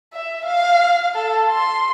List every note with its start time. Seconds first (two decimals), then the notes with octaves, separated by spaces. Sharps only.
0.13 E5
0.46 F5
1.14 A4
1.50 C6